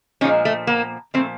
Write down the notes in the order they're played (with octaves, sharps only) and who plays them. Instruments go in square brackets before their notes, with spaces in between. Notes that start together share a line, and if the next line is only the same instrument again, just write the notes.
[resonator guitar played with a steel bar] A#2 F3 G#3 C#4 D#4
A3
A#3
A#2 F3 A3 C4